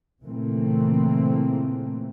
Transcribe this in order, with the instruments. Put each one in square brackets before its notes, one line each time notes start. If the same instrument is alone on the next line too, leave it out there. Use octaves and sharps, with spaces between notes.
[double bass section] A#2 C#3 E3 A3 A#3 C4